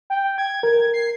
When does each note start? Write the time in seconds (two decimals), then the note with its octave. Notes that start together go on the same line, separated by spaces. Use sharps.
0.10 G5
0.38 G#6
0.63 A#4
0.93 C7